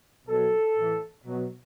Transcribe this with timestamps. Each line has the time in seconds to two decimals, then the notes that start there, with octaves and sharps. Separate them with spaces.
0.28 B2 F#3 A4
0.76 A2 E3
1.25 B2 F#3